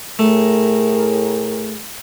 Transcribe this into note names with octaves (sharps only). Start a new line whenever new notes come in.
A2 A3 G#4 A#4